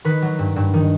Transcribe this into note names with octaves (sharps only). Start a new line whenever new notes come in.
D#3 B4
F#3
G2
G2
D#3